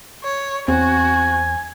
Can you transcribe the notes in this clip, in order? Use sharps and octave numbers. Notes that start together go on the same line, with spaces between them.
C#5
E2 C4 F#4 G#5